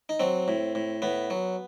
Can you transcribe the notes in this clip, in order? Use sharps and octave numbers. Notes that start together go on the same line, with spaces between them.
D#4
F#3 C4
A2
A2
A2 B3
F#3